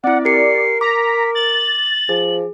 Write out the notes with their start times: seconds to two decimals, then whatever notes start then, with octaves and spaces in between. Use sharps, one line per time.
0.04 C4 E4 D5 F#5
0.25 G4 A#4 C7 C#7
0.81 A#5 D6 B6
1.35 A6 F#7
2.09 F3 G#4